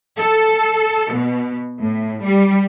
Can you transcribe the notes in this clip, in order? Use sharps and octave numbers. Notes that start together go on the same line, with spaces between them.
A4
B2
A2
G3